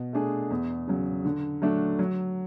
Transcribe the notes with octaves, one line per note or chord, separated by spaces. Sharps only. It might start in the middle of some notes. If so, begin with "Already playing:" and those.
Already playing: B2
A3 D4 G#4
E2
C#3 F#3
D3
F#3 A3 D4
F#3